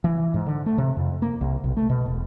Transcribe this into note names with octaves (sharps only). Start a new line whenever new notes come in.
E3
G#2
D3
A3
C3
F2
A#3
C2
B1
A3
B2
E1